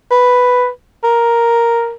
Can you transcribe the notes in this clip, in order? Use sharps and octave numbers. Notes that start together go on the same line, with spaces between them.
B4
A#4